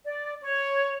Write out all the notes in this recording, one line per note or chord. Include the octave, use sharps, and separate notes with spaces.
D5
C#5